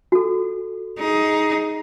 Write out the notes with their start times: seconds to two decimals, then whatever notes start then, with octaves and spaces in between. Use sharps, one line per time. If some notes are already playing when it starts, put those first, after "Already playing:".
0.12 F#4 A4
0.99 D#4 G#4